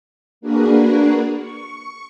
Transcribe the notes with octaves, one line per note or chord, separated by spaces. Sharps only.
A#3 D4 F#4 G#4 A#4 B4
C#6